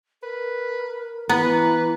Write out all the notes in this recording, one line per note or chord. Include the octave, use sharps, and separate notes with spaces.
A#4 B4
E3 B3 B4 A#5